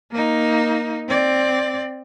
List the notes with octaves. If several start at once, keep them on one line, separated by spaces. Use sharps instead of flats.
A#3 D#4
C4 D5